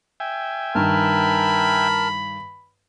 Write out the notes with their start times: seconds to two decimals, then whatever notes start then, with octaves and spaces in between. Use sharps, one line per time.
0.20 E5 G5 G#5
0.75 G2 D#3 A#4 A5 B5 F6